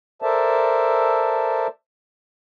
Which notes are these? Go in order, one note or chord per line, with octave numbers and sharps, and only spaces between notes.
A4 A#4 C5 D5 E5 A5